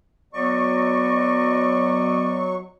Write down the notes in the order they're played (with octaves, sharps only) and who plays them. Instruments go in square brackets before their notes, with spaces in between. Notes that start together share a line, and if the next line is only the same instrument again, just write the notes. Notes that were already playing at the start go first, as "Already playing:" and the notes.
[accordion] F#3 C#6 [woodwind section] B3 D5 D#5